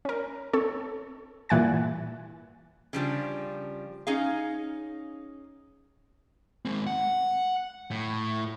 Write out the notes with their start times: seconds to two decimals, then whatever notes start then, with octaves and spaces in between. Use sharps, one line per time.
0.05 C#4 A#4
0.53 C4 A4 C#5
1.49 G2 A#2 E3 F#5 G#5 A6
2.93 C#3 F3 G3 D4
4.07 C#4 D#4 G#4 F5
6.65 G#3 C4
6.87 F#5
7.91 A2